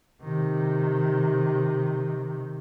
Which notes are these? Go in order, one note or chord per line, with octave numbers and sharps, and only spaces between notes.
C3 D#3